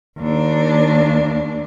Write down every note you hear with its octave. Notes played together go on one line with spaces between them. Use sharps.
D#2 D4